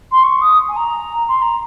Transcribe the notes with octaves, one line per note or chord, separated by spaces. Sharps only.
C6
C#6
D#6
G#5
A#5
C6
A#5